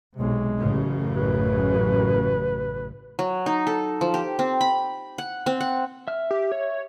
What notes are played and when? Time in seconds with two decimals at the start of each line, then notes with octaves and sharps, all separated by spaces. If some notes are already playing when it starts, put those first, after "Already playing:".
0.17 B1 C3 G#3
0.58 A1 F#2 C#3
1.15 B4
3.19 F#3
3.46 D#4
3.67 A4
4.01 F3
4.14 G4
4.39 C4
4.61 B5
5.18 F#5
5.46 C4
5.61 F#5
6.08 E5 F6
6.31 G4
6.52 C#5